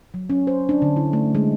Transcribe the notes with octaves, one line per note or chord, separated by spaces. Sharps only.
F#3
C#4
C5
D4
D3
E4
A3
G#3